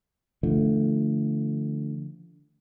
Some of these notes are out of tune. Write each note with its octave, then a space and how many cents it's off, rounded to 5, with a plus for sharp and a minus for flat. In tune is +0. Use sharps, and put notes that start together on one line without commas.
D3 -5 F3 -35 A3 +0